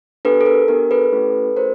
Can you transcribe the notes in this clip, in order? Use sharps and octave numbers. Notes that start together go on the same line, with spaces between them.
B3 D4 G4 A4 B4
A4
A#4
B3 D4 G4 A#4
A4 B4
A3 C#4 E4 G4
A3 C#4 E4 G4 A#4 C5